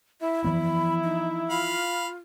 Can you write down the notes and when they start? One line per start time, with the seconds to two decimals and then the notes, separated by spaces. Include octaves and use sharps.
0.21 E4 E5
0.44 E3 F3 B3 B5
1.04 D#4
1.50 F4 F5 B5